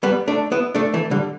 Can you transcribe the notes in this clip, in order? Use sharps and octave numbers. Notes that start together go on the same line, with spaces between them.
G3 B3
A3 D4
B3 E4
A3 D4
E3 A3
D3 G3